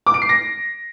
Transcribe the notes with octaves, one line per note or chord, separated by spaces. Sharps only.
D6
D7
C7
A#6